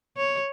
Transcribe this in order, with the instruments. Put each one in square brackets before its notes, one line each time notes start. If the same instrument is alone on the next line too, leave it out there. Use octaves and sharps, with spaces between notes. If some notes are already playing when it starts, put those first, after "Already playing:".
[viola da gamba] C#5